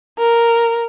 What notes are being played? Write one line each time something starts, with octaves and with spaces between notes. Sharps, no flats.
A#4